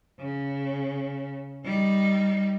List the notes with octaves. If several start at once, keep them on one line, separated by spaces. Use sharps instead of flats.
C#3
G3 D#4